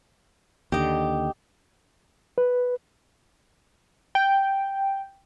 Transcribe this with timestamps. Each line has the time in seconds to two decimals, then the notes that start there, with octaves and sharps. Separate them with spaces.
0.72 D#2 D3 G4 D#5
2.38 B4
4.15 G5